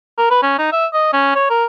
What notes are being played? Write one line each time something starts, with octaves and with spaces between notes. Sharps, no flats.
A#4
B4
C#4
D#4
E5
D#5
C#4
C#5
A#4